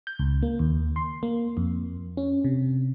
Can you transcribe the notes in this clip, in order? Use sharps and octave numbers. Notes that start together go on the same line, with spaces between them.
G6
C#2
A#3
D#2
C6
A#3
F2
C#4
C3